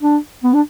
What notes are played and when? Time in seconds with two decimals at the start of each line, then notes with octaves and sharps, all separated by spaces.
0.01 D4
0.44 B3
0.54 D4